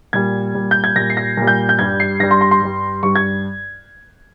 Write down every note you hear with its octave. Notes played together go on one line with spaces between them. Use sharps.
A#2 G3 G#6
A#2 G3
G6
G#6
A#2 G3 A#6
C7
A#6
A#2 G3
G6
G6
G2 G3 G#6
C7
G2 G3 A#6
C6
C6
C6
G2 G3
G2 G3 C#6
G#6